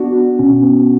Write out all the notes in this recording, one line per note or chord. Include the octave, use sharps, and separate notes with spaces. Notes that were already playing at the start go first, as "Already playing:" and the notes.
Already playing: B3 D4 F#4
B3 D4
B2 C#4
B3